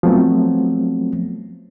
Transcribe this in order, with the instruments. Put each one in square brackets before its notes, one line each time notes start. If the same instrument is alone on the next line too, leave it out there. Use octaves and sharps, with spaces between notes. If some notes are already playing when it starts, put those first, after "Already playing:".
[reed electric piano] F3 F#3 A3 B3 C4